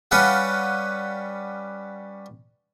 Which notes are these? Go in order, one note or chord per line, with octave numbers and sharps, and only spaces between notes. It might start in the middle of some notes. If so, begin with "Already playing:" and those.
G3 C#4 G4 B4 F5 F#5